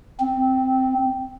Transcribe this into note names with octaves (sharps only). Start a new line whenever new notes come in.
C4